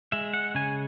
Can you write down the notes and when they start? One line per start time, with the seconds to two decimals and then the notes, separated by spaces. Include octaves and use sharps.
0.12 G#3 E5
0.33 F#5
0.55 C#3 G#5